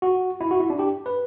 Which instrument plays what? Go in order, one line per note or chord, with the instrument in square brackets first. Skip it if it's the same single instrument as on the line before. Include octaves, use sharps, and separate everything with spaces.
[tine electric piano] F#4
E4
F#4
E4
D4
G4
B4